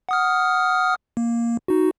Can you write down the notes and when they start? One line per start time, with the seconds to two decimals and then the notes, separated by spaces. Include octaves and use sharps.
0.09 F#5 D#6 F6
1.17 A#3
1.68 D#4 F#4